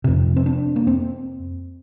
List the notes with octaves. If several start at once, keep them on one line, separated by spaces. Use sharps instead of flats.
F2 C3 C4
C4
D4
A#3
C4